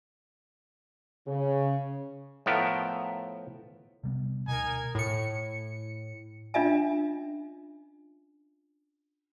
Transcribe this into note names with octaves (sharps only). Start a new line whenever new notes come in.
C#3
A2 F3 B3 A#4 E5 G5
C3 G3 B3
D2 B2 D#4 A#4 G#5
A2 C#7
C#4 D4 F4 D#5 E5 G#5